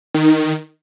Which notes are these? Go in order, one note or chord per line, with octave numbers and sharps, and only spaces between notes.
D#3